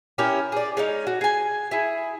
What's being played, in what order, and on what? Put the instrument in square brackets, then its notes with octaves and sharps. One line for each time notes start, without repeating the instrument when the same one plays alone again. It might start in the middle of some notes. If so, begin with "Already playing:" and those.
[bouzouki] C#4 E4 G4 A#4
G#4 D5
G#3 C#4 D#4
F#4
G#4 G#5
E4 G#4